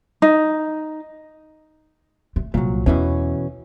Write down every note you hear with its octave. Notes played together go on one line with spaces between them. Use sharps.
D#4
A3
C2 A#2 F#3
E2 B2 E3 C#4